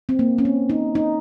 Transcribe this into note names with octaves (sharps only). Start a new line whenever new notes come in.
C4
A#3
C#4
C4
D#4
D#4